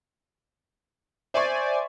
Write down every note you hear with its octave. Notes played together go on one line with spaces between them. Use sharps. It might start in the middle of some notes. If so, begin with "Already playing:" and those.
C5 D5 E5 G#5 C#6